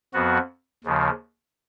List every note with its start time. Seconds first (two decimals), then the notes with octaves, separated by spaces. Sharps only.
0.13 F2 F3 B3 F#4
0.84 D#2 C#3 F3